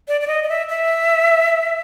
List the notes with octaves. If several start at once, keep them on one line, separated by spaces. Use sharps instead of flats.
D5
D5
D#5
D#5
E5
E5